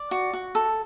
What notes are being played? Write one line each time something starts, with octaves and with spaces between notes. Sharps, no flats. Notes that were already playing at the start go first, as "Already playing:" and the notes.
Already playing: D5
F#4
F#4
A4